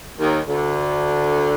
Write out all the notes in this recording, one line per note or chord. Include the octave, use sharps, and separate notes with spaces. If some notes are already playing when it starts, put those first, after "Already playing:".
D#2 D#3
D2 D3